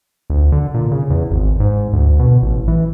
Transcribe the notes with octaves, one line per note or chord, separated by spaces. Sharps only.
D2
D3
A#2
C#3
E2
G#1
G#2
D2
B2
A1
E3